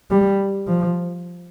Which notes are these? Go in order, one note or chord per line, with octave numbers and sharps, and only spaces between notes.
G3
F3